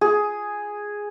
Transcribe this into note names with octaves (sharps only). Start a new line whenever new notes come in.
G#4